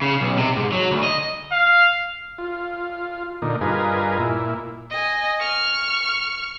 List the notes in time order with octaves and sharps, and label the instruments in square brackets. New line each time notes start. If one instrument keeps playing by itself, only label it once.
[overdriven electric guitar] C#3
B1
C3
G#2
F#3
D2
D#5
[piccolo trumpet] F5
[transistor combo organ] F4
A#2 D3 D#4
G2 F4 G#4 A#4 B4 D#5
A#2 E4
[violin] D#5 G#5
C#6 F6